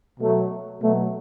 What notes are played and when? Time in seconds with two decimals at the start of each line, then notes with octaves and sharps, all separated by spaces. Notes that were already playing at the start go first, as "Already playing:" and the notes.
0.19 B2 F#3 A3
0.81 B2 F#3 A3